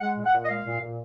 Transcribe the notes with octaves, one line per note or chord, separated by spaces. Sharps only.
G#3 F#5
A#2
F#5
A#2
D#5
G#3 F5
A#2
A#2